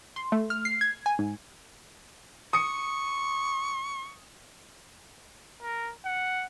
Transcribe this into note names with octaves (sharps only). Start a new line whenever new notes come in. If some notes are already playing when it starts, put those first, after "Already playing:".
C6
A3
F6
C7
G#6
G#5
G#2
C#6 D#6 C#7
A#4
F#5